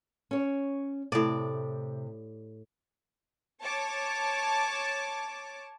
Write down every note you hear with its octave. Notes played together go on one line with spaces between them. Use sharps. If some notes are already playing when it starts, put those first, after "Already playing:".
C#4 C#5
A2 C3 D5
C#5 A5 D6